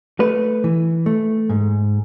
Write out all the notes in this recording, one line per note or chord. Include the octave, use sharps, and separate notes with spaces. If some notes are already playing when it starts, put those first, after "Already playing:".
A3 B4
E3
A3
G#2